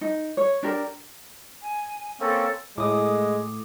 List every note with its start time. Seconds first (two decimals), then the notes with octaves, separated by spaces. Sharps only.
0.01 D#4
0.37 C#5
0.63 D4 G4 A#4
1.61 G#5
2.20 A#3 C4 C#4 A4
2.78 A2 G#3 D6 D#6